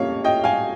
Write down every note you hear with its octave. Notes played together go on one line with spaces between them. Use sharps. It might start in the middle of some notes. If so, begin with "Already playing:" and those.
Already playing: F2 C#3 G3 A#3 C#5 F5
D#5 G5
F5 G#5